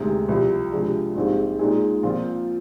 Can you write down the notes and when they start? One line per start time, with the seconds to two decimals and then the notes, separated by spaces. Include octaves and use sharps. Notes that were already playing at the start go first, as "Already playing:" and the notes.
Already playing: D2 C3 D#3 G#3 D#4
0.29 C2 C3 F3
0.72 C3 F3 G#3 D4
1.16 A#1 G#2 G3 C4
1.59 A#2 G#3 D#4 G#4
2.03 A#2 F3 C4 F4